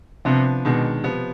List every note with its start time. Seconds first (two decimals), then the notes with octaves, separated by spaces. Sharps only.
0.25 C3 F3 B3 D4
0.65 B2 D#3 G#3 D4
1.04 C3 F3 B3